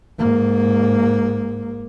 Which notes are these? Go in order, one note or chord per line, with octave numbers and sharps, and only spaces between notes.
G#2 A#3